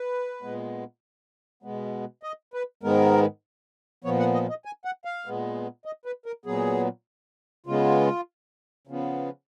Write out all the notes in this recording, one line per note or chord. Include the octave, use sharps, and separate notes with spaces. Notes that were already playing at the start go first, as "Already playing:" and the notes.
Already playing: B4
A#2 G#3 B3
B2 G#3 B3
D#5
B4
G#2 D#3 G#3 B3 A#4
A#2 F3 B3 C#5
F#5
D#5
D#5
G#5
F#5
F5
A#2 G#3 B3
D#5
B4
A#4
A#2 F#3 B3 G#4
C#3 G#3 B3 F4
C#3 F3 B3